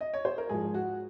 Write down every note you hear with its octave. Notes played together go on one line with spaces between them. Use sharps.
D#5
C#5
C5
A#4
G#2 F3 G#4
F#4